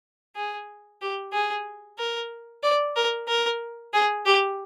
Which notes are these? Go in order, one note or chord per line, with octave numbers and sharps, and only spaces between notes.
G#4
G4
G#4
A#4
D5
A#4
A#4
G#4
G4